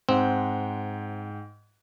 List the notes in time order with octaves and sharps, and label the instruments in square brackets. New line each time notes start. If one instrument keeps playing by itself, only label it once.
[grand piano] G#2 F#5 G5 [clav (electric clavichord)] C4